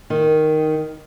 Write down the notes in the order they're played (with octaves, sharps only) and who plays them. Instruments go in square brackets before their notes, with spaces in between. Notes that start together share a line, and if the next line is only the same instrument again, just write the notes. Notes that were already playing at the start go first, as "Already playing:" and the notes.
[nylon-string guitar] D#3